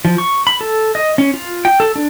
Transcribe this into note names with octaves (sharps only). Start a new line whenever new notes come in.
F3
C#6
B5
A4
D#5
C#4
F4
G5
A4
D4